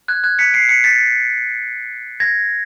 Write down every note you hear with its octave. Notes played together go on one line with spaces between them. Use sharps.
F#6 G#6
F#6 G#6
B6 C#7
C7 D7
B6 C#7
A6 B6
G#6 A#6